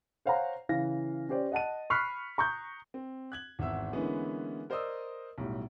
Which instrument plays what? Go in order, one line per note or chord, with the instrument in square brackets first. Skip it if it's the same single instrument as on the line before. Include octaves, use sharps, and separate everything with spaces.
[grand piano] C5 C#5 F5 F#5 G#5 A#5
C#3 E3 F5 A#6
C#4 G4 C5 D5
D#5 F#5 A5 D#7
B5 C#6 F6 F#6 B6 C7
A#5 C#6 D#6 G6
C4
F#6 G#6 F#7
G#1 E2 E5 E6
D3 E3 G#3 A#3 B3 C#4
A#4 C5 D5 D#5 D#6 E6
B1 A2 G3